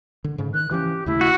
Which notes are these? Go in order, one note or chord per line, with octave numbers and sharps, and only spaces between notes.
D3
G#2 C#3
D#3 F#6
E3 F3 C#4 G4
D#2 C#3 A3 E4
F#4